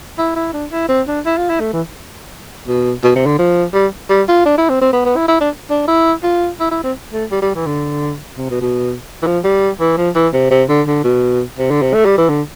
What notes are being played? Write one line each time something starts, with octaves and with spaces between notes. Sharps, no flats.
E4
E4
D4
E4
C4
D4
E4
F4
E4
A3
E3
B2
B2
C3
D3
F3
G3
G3
F4
D4
E4
C4
C4
B3
B3
E4
E4
D4
D4
E4
F4
E4
E4
C4
A3
G3
G3
E3
D3
C3
B2
B2
E3
F3
G3
E3
F3
E3
C3
C3
D3
D3
B2
C3
D3
C3
A3
G3
E3
D3